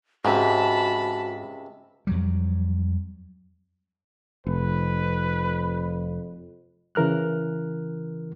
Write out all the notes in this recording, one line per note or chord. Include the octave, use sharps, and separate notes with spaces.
C#2 G#2 C3 F#4 A5 B5
F2 F#3 G3
F1 F2 B4
C#3 E3 A#4 F6 F#6